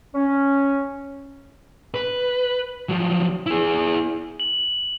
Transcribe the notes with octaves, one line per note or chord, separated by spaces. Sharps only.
C#4
B4
F3 F#3
E4 G#4
F#7